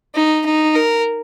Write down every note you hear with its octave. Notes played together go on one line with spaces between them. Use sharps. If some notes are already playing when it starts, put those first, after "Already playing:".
D#4
D#4
A#4